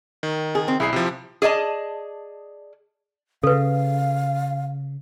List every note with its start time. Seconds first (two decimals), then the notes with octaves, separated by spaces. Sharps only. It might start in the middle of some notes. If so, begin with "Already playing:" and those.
0.23 D#3
0.55 G#4
0.68 C4
0.80 B1 E4 G#4 C7
0.93 C3 F3
1.42 G#4 D5 D#5 A5
3.43 C#3 A4 B4 F5